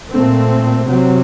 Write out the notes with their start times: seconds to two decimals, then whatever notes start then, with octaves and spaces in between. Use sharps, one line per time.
0.12 A#2 A3 C4
0.86 C3 F#3 C4